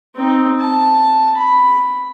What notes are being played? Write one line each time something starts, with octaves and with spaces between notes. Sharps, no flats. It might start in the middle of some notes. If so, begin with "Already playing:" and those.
C4 D#4
A5
B5